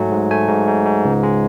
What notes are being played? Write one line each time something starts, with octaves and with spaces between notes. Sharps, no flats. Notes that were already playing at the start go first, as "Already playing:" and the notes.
Already playing: G#2 F#3 A3 G#5
G#2
A3 G#5
G#2
G#2
G#2
C#2
G#3